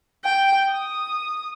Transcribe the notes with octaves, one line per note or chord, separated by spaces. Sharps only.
G5
D#6